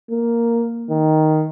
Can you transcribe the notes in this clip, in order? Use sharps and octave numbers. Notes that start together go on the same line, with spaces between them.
A#3
D#3